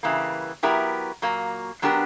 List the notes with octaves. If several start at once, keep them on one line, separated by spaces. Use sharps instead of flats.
C#3 E3 G3 A#3
F#3 B3 E4 G4 A#4
A#2 F#3 A#3
F#3 B3 D4 G4 A#4